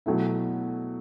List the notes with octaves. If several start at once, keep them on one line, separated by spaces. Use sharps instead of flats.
B2 F#3 A3 E4